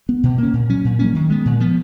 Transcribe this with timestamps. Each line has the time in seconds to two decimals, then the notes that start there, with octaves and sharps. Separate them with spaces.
0.09 B3
0.23 B2
0.38 A#3 C#4
0.53 A#2
0.69 F#3 C#4
0.85 A#2
0.99 F#3 A#3 C#4
1.15 D#3
1.30 G#3 B3
1.45 A#2
1.60 F3 B3